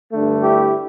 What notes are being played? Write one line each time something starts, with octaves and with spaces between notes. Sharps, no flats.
G2 D3 A3
E4 G4